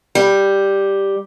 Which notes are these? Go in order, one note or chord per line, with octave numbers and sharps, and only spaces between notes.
G3